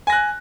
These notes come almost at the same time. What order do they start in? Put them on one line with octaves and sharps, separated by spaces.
G#5 A#6 F#6